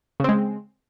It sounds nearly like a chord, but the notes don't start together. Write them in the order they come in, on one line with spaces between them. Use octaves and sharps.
C#3 C4 G#3